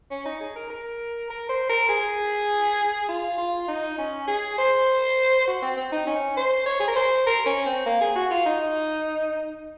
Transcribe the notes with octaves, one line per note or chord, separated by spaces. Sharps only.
C#4
D#4
G#4
A#4
A#4
A#4
C5
A#4
G#4
F4
F4
D#4
C#4
G#4
C5
F#4
C4
C4
D#4
C#4
C5
C#5
G#4
A#4
C5
A#4
C#4
C4
A#3
G#4
F#4
F4
D#4